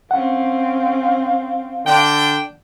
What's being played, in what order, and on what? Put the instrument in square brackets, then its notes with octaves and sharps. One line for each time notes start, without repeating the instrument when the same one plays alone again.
[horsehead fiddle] C4 C#4 [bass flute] F5 [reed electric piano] F#5
[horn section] D3 D4 G5